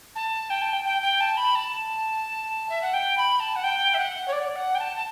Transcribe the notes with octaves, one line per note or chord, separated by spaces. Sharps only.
A5
G5
A5
G5
G5
G5
A5
B5
A5
E5
F#5
G5
B5
A5
F#5
G5
E5
F#5
C#5
D5
F#5
G5
A5
A5